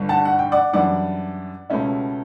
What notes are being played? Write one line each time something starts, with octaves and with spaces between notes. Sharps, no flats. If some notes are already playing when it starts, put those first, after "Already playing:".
Already playing: G1 G2 D3 G3
F#5 A5
F#5
G5
D5 F#5
F#2 E3 G3 D4 D5 F#5
C#2 B2 A3 C#4 E4